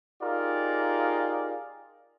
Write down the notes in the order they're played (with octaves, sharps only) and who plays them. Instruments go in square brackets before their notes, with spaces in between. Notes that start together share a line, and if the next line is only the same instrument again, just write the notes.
[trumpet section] D#4 F4 G4 G#4 A#4 D5